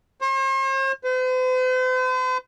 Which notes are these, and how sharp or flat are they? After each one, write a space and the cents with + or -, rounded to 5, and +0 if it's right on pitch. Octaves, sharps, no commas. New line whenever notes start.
C5 +45
C5 -45